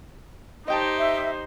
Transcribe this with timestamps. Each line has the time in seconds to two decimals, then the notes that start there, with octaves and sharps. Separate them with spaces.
0.68 D#4 G4 C5 D#5 G5 A5
0.98 E5